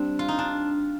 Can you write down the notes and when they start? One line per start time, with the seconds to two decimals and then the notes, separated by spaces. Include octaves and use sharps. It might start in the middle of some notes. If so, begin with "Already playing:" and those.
Already playing: G3 C4 D4
0.19 F4
0.28 D#4
0.39 D4